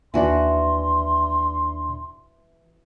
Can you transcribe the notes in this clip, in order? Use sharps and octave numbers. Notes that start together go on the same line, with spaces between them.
D#2 E3 D4 F#4 D5 C6